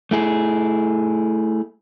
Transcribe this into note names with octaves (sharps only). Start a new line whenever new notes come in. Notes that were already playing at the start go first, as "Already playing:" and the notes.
A3 E4 G#4